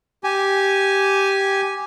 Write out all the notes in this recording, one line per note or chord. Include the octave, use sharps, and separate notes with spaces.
G4 G#5